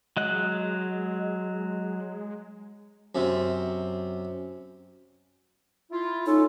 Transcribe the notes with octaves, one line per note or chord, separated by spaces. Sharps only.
F#3 G#3 D#5 F#6
F#2 C3
E4 F4
C#4 D#4 F4 A4